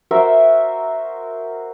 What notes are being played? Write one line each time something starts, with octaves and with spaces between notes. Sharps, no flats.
F#4 A#4 C5 E5